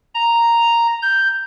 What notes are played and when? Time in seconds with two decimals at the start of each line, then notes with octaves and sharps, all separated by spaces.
0.14 A#5
1.02 G6